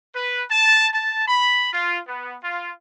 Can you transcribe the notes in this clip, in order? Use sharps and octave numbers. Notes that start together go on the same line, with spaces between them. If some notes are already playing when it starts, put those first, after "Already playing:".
B4
A5
A5
B5
F4
B3
F4